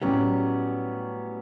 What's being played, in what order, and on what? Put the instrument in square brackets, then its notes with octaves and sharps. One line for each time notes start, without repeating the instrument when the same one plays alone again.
[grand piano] A2 F#3 C#4 G4 [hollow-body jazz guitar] G3 B3